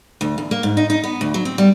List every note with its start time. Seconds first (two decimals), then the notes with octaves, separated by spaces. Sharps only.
0.21 D2
0.38 E2
0.51 A#3
0.63 G#2
0.77 D#4
0.90 D#4
1.04 B3
1.21 D2
1.34 F#3
1.45 C4
1.58 G3